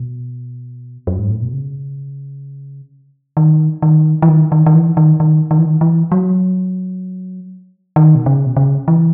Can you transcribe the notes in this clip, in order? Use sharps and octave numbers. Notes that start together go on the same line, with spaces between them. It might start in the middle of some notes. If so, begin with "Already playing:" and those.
Already playing: B2
F#2
G#2
A2
B2
C#3
D#3
D#3
E3
D#3
D#3
D#3
E3
D#3
D#3
D#3
E3
D#3
E3
F#3
D#3
B2
C#3
B2
C#3
E3